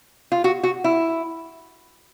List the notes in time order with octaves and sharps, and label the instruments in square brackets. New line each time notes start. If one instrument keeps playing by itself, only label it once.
[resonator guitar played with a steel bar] F4
F#4
F#4
E4